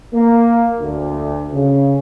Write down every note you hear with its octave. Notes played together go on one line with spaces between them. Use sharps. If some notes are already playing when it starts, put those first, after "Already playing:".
A#3
D2
C#3